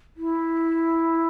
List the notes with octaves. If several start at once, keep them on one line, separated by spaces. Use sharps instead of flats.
E4